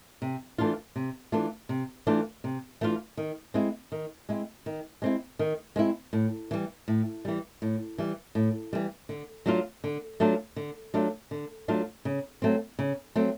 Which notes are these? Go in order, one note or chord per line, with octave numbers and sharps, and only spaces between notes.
C3
E3 A3 D4 F4
C3
E3 A3 D4 F4
C3
E3 A3 D4 F4
C3
E3 A3 D4 F4
D#3
G#3 C4 E4
D#3
G#3 C4 E4
D#3
G#3 C4 E4
D#3
G#3 C4 E4
A2
E3 G3
A2
E3 G3
A2
E3 G3
A2
E3 G3
D3
F#3 A3 D4 F4
D3
F#3 A3 D4 F4
D3
F#3 A3 D4 F4
D3
F#3 A3 D4 F4
C#3
F#3 A3 C4
C#3
F#3 A3 C4